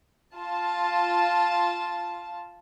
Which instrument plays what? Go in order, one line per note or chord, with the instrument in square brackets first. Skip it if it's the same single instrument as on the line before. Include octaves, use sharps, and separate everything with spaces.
[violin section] F4 A5